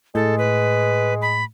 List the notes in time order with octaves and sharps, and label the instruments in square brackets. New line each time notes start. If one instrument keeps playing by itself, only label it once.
[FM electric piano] A2 [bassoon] G#3 [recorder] A4
[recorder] B4
B5